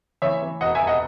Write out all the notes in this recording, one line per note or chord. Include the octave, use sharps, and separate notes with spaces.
E3 C#5 E5
E3
E1 D#5 F#5
E5 G#5
E1
D#5 F#5